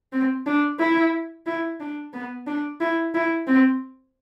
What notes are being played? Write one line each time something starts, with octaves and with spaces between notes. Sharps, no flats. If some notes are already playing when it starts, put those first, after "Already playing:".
C4
D4
E4
E4
D4
B3
D4
E4
E4
C4